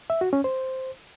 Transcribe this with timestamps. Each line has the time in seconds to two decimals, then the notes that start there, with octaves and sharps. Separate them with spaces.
0.10 E5
0.21 F#4
0.33 C#4
0.44 C5